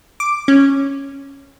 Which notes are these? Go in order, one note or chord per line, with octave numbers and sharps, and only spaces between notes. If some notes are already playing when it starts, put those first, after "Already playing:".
D6
C#4